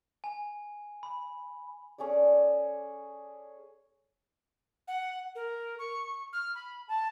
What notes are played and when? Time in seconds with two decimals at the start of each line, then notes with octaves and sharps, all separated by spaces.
0.24 G#5
1.03 B5
1.98 C#4 G#4 A4 D5
4.88 F#5
5.35 A#4
5.79 C#6
6.33 F6
6.55 B5
6.88 A5